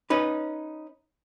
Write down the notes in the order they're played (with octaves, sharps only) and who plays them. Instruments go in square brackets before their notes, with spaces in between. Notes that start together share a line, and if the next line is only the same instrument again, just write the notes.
[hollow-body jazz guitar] C#4 D#4 B4